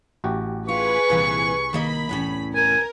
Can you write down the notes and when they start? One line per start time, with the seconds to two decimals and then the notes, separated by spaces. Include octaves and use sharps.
0.24 A1 F#4 G4
0.69 F4 G#4 B4 C#6
1.10 C2 A#2 E3 C4
1.73 D#3 A#3 D#5 B5
2.09 E2 A2 C#4
2.55 A#4 G#5